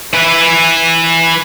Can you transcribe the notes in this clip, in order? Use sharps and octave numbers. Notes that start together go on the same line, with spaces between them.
E3 B4